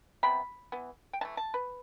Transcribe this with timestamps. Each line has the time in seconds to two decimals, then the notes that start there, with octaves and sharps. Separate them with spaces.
0.23 C3 G3 B3 B5
0.72 E3 B3
1.13 G5
1.21 E3 A5
1.25 A3
1.37 A5
1.54 B4